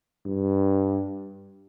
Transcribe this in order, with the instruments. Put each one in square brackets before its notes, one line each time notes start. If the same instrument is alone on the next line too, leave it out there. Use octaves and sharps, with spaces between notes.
[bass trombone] G2